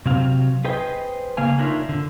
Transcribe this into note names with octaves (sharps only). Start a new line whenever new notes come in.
C3 F#3 C4 F5
G#4 B4 C5 D#5 G5
C#3 A#3 F5 G#5
D4 D#4 F4 A#4 C#5 E5
D3